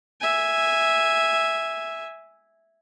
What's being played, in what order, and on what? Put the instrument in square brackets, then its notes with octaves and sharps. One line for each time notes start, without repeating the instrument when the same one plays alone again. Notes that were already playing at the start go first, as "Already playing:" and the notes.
[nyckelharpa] E5 G#5